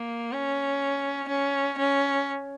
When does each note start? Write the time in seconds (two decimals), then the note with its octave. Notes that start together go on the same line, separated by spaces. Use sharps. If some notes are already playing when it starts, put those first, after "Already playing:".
Already playing: A#3
0.32 C#4
1.29 C#4
1.79 C#4